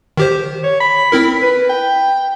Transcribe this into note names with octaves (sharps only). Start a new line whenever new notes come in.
D#3 G4 C5
C#5
B5
C4 E4 A#4
B4
G5